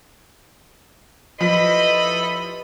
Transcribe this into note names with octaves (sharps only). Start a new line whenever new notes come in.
F3 E4 G4 A4 B4 D#5 B5